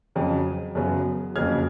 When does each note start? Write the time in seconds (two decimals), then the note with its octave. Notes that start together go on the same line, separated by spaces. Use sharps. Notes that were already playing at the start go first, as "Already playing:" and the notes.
0.15 F2 C#3 F#3
0.75 F#2 C#3 F#3 B3
1.36 F#1 F2 C#3 F#3 F6 G#6